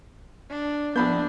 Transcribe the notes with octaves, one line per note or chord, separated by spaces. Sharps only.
D4
A#1 B3 D4 B5 G6